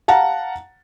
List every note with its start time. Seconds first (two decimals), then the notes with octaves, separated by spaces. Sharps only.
0.08 F5 F#5 A5 A#5